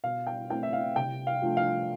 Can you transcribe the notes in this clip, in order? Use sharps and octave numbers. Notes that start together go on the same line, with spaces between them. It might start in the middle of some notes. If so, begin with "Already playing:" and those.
B2 F5
G5
A3 C4 E4 G5
E5
F5
C3 G5
F5
F3 A3 D4 F4
F5